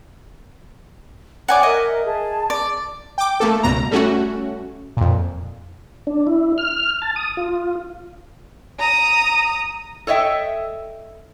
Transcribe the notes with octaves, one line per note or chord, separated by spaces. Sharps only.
C#5 D5 F#5 G#5 D6 D#6
A#4 D#5 E5
G#4 A5
D5
G5 D6
A3 A#3 A4
C#2 G2 B2 A#5
G3 A3 C#4 F#4
F2 A#2
D4
E4
F6
A5
D#6
F4
A#5 D#6
A4 C#5 D#5 E5 G5